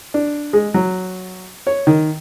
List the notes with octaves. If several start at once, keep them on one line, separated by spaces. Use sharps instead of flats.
D4
G#3
F#3
C#5
D#3